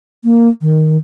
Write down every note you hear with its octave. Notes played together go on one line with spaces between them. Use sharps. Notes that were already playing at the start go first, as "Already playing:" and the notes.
A#3
D#3